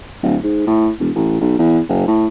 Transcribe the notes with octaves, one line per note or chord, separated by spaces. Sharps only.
D1
G#2
A2
E1
A1
B1
E2
F#1
A2